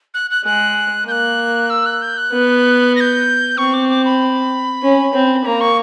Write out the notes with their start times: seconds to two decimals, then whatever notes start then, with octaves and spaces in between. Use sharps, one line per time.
0.14 F#6
0.31 F#6
0.45 G#3 F#6
1.08 A#3 G6
1.12 F#6
1.70 E6
1.86 F#6
2.02 G6
2.17 F#6
2.33 B3
2.96 A#6
3.00 G6
3.58 C4 C#6
3.74 D6
3.89 D6
4.05 B5
4.83 C#4
5.14 C4
5.45 A#3 A#5
5.61 C#6